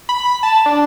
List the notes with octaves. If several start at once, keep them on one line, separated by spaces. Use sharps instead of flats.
B5
A5
D4